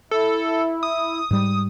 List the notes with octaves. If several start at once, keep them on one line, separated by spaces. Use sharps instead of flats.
E4 A4
D#6
G#2 G3